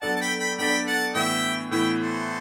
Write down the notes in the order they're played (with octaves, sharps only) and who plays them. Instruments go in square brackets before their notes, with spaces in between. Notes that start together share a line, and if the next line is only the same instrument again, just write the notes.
[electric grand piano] F#3 B3 D4 A4 D5 [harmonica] F#5 A5
[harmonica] A5
G5 B5
G5 B5
[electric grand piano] F#3 B3 D4 A4 D5 [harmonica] G5 B5
[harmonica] F#5 A5
[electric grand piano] A2 E3 B3 [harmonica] E5 G5
[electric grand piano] A2 E3 B3 [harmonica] E5 G5
[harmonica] A4 C5